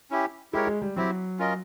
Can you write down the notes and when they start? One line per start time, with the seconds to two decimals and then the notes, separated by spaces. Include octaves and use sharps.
0.11 C#4 E4 G4
0.53 G#3 E4 G4 A#4 C#5
0.67 G#3
0.82 G3
0.96 F#3 C4 E4 G4
1.39 C#4 F4 A#4 D#5